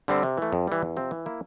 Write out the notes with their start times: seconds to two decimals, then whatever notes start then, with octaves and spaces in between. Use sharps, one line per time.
0.08 D3 G3 C4
0.23 C3
0.37 E3 A3
0.52 F2
0.67 E3 G3
0.83 E2
0.97 C3 F3 C4
1.11 E3
1.26 A#3 E4